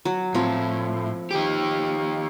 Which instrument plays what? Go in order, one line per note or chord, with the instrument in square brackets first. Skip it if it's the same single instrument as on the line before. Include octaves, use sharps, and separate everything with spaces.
[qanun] F#3
[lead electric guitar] A2 [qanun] F3 C4
[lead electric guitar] D#3 G4